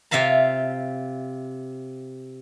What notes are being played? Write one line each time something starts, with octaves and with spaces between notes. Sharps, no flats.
C3 F4 E5 F5 A#5